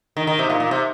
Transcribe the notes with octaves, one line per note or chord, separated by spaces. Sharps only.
D#3
D#3
C3
A#2
A#2
C3